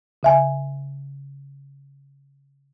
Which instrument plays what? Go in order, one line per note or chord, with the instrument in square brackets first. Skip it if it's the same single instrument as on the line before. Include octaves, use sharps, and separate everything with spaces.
[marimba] C#3 E5 G#5